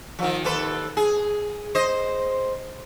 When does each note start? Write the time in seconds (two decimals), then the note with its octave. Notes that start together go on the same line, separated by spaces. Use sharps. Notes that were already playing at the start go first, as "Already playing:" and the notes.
0.19 D#3 F3
0.45 D#2 A4 B4
0.97 G#4
1.75 C5 D#5